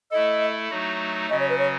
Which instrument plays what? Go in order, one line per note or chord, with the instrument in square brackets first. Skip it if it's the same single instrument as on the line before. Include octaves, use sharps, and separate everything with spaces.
[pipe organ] A3 E4 A4 [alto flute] D#5
[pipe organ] F#3 A3 D#4 F#4
[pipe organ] C#3 F#3 C#4 F#4 [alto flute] D#5
[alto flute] C#5
B4
C#5